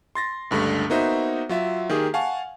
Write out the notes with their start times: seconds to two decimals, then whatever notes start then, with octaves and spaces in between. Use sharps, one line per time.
0.15 C6 A6 A#6
0.51 C#2 G2 D3 A3
0.90 A#3 B3 D#4 F#4 C5 E5
1.49 F#3 F4 E5
1.89 D#3 A#3 G4 G#4
2.14 F5 F#5 G#5 A5 C#6